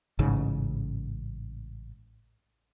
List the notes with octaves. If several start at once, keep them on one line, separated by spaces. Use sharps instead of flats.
A1 G#2 C#3